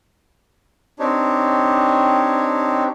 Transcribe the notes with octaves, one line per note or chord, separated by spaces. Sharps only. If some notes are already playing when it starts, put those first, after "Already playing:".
C4 D4 D#4 G4 C#5